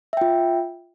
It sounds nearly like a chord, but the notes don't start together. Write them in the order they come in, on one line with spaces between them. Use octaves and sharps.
E5 G5 F4